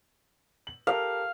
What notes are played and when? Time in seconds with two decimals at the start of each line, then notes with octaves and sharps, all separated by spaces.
0.67 F#7
0.87 G4 A4 A#4 F5